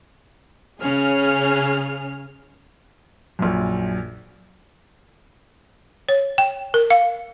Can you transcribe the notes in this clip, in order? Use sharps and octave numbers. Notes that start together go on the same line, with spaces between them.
C#3 C#4 G#4 F6
A#1 F#2
C#5
G5
A#4
F5